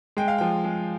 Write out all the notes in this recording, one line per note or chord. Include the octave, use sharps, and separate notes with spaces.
G#3 G5
F5
F3 G5
G#3